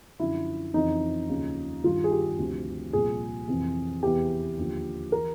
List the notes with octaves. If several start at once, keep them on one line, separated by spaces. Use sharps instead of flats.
F#2 D3 F3 E4
F2 C#3 E3 D#4
D#2 C#3 F3
G2 D#3 F4
G#4
G4
D2 C3 F3
C2 A#2 F3 G#4
F2 C3 E3
E2 C3 E3 G4
D#2 D3 F3
E3 A#4